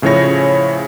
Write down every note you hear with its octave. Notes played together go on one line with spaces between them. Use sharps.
A2 C#3 F3 E4 C#5 A#6